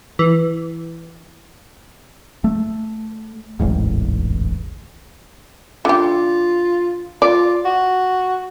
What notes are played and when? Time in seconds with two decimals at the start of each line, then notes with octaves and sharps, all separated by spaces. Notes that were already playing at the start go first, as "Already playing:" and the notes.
0.19 E3
2.44 A3
3.60 D1 A1 E2 G#2
5.85 D3 F4 G4
7.22 F4 D5
7.65 F#4